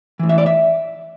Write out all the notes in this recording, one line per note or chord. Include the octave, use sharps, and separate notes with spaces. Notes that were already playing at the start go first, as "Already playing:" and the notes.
A2 E3
E5
D5
E5